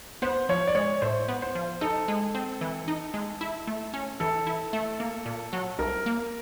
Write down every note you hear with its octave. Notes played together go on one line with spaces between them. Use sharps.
B3 C5
F3 C#5
D5
G#3 C#5
A2 C5
B3
C5
F3
D#4 A4
G#3
C4
E3
D#4
G#3
E4
A3
C#4
E3 A4
E4
A3
A#3
A#2
F#3
C2 A#4
A#3